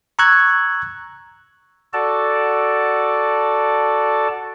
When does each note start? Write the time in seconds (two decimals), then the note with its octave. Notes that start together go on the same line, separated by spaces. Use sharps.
0.19 A#5 C#6 E6 F#6 G#6
1.93 F#4 A4 D5 A5